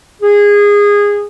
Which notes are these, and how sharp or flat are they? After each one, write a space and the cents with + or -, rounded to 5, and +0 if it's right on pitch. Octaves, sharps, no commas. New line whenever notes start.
G#4 -20